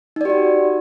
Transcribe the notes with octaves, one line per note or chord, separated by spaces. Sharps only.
D#4 F#4 G4 D5